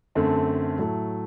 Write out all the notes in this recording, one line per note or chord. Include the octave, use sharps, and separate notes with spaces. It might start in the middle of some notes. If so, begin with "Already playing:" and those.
F#2 D3 A3 C4
A2 F#3 A3